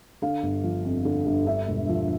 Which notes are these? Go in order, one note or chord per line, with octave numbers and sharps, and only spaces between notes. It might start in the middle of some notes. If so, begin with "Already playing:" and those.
D3 F5
G1
F3
F2
D3
G1
D3 E5
E1
F3